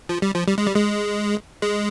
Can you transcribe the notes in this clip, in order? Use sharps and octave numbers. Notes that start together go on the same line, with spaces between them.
F3
G3
F3
G3
G#3
G3
G#3
G#3